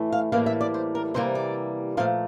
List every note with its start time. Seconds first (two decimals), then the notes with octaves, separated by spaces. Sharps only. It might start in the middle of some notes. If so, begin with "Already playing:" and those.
Already playing: A2 E3 A3
0.12 F5
0.32 A2 E3 G3 A#3 F5
0.46 E5
0.61 D5
0.74 C5
0.95 A#4
1.14 C3 E3 G3 A#3 C5
1.35 D5
1.97 A#2 F3 A3 F5